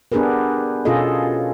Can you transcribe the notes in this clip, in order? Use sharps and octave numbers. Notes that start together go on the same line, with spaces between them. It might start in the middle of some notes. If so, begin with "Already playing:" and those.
B3 D4 G4 G#4 A#4 B4
B2 C#4 F4 G#4 A4 D#5